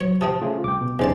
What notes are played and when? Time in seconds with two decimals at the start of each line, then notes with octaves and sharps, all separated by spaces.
0.01 F#3 C#5
0.21 C3 F3 C4 A5 D#6
0.42 C#3 A3 F4 G#4
0.64 C2 G5 D6
0.81 B2
0.99 B1 E2 C#4 D#4 G#4 C5 D5 A5